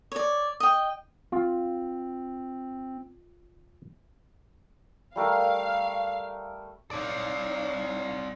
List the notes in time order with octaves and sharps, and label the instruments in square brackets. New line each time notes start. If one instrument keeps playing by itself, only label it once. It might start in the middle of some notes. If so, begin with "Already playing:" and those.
[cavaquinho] C#5 D5
D#5 G5
[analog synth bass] C4 [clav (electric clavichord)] F4
[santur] G3 A3 A#4 [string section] F5
[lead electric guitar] C4 D5 [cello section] D#4 C#5 F5